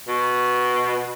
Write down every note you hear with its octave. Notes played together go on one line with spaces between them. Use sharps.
B2